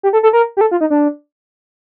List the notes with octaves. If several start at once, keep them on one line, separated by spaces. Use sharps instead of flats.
G4
A4
A4
A#4
G4
A4
F4
D#4
D4